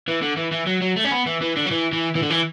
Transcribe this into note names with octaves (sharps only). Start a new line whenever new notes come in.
E3
D3
E3
E3
F#3
F#3
A3
C#4
B3
E3
E3
D3
F#3
E3
E3
E3
D3
E3